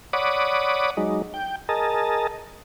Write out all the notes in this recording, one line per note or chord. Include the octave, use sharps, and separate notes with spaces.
C#5 D5 F#5 B5 D6 D#6
F#3 G#3 D#4
G5
G#4 A#4 D#5 A5